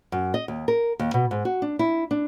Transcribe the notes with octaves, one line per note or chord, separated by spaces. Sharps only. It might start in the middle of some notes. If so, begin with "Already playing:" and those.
F#2
D#5
D#2
A#4
D#2
B2
G#2
F#4
D4
E4
D4